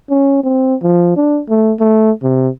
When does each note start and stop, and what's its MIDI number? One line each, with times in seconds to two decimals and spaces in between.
0.10 0.41 61
0.44 0.75 60
0.82 1.12 53
1.17 1.40 62
1.49 1.73 57
1.80 2.11 57
2.23 2.49 48